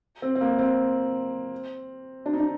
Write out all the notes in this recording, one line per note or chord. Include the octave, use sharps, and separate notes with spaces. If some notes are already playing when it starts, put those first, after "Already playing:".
C4
C4
A#3
C4
D4
D#4
D4